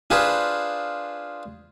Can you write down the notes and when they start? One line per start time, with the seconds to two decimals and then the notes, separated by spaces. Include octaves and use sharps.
0.10 D4 F4 G#4 B4 C5